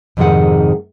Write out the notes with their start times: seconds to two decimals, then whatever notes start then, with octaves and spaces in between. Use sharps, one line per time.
0.17 F2 G#2 C3 D#3 G#4 F#5